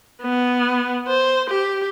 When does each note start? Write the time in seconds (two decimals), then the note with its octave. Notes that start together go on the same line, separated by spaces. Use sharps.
0.21 B3
1.07 C5
1.50 G4